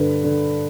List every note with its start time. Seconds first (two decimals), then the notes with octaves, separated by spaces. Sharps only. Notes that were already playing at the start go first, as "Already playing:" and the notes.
Already playing: G2 D3 B4
0.24 D3